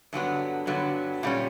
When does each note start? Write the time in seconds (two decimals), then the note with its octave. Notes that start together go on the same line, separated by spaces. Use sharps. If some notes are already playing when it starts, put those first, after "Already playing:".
0.13 G2 D3 F#3 B3
0.67 G2 D3 F#3 B3
1.23 A#2 G3 C#4